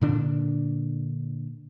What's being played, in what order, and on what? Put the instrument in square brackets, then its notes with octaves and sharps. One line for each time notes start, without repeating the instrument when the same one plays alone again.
[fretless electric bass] A#2 D3 D4